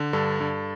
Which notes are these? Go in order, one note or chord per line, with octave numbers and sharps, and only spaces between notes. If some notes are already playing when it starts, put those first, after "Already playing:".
Already playing: D3
G2 A4
G2